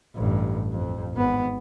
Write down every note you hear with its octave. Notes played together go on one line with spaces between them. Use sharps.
A1 G2
F2
G#1 B3